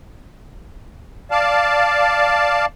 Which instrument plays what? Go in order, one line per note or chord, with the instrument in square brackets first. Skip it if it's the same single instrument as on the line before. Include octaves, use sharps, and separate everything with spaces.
[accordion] D5 F5 A5